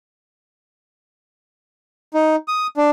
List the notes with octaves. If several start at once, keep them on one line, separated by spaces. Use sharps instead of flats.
D#4
D#6
D4